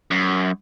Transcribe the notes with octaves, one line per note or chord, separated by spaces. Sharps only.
F#2